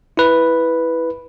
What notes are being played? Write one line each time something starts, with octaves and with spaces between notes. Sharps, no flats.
E4 B4